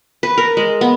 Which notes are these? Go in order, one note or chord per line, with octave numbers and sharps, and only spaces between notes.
B4
A#4
G#3
B3